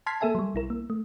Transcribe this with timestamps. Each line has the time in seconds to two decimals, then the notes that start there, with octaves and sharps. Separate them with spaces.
0.06 A5 C6 F6 G#6 B6 C7
0.21 A#3 A4 A#4 E5 G#5 A5
0.35 F#3 G3
0.54 B1 E4 A#4
0.70 A#3
0.90 A3